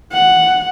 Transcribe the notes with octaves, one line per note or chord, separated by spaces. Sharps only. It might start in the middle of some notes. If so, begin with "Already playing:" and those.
F#5